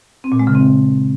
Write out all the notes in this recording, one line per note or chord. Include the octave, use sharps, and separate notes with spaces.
C4
A#2
G#3
C#3
C4